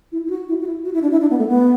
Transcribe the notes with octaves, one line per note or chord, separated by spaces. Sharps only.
E4
E4
F#4
E4
F#4
E4
F#4
E4
D4
E4
D4
B3
A3
B3